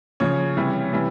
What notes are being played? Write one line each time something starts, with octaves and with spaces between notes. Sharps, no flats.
C#3 F3 C#5
C3 E3 G3
C3 E3 G3